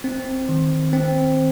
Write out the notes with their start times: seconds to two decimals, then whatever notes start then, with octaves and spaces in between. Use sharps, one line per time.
0.04 C4
0.49 D#3
0.93 C4